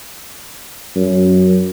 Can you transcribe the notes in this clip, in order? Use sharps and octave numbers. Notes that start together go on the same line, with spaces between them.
F#2